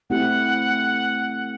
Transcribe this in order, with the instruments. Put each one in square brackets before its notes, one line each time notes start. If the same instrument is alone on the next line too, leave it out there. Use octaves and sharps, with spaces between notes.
[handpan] A3 C4 E4 G4 [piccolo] F#5